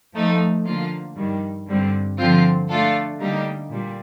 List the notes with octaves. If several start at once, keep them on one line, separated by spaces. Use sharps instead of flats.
F3 A3 D#4
D3 F3 A#3 F4
G2 D#3 G3
G2 D3 G3 C4
D3 F3 C4 F4
A3 D4 F4 A4
D3 G3 A#3 D#4 G4
A#2 G3